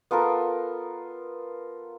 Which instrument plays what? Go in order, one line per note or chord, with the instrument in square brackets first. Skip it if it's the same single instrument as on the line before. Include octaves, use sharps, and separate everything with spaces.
[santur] B3 F4 A4 A#4